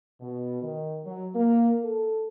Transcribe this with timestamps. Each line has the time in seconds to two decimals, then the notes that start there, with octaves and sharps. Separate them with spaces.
0.21 B2
0.62 D#3
1.05 F#3
1.34 A#3
1.83 A4